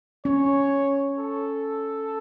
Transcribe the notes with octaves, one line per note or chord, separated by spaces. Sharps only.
C#4 C#5
A4